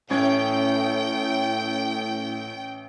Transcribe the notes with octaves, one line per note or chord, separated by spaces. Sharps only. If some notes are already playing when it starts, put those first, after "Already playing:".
A1 A2 C#4 G5 G#6